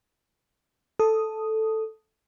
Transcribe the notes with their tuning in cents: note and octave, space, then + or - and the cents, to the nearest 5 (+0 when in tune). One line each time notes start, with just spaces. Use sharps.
A4 +0 D#6 +0